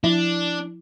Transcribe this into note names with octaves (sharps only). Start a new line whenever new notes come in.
F3 D4 E4